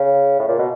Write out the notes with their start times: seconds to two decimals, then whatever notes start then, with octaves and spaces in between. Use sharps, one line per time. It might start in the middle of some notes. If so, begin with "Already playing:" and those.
Already playing: C#3
0.39 A2
0.48 A#2
0.59 B2